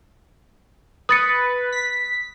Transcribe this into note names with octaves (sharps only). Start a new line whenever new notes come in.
B4 D#6 A6 C#7
B6